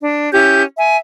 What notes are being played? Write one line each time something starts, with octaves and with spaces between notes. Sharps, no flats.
D4
C#4 E4 G4 G6
E5 G#5